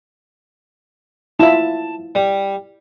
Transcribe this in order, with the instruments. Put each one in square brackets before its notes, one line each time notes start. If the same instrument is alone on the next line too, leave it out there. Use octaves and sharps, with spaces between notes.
[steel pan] E4 F4 E5 [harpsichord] A5
[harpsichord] G3